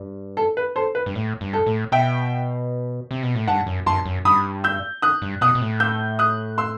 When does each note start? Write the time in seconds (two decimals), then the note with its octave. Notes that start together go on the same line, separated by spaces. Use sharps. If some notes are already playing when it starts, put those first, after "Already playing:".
Already playing: G2
0.37 A4
0.57 B4
0.76 A4 C5
0.95 B4
1.06 G2
1.15 A2
1.41 G2
1.53 A4
1.66 A2
1.92 B2 E5 G5
3.11 C3
3.23 B2
3.35 A2
3.47 G2 F#5 A5
3.66 F#2
3.86 F#2 A5 C6
4.06 F#2
4.25 G2 B5 D#6
4.64 E6 G6
5.02 D#6 F#6
5.22 G2
5.41 B2 D#6 F#6
5.55 B2
5.61 A2
5.80 E6 G6
6.19 D#6 F#6
6.58 C6 E6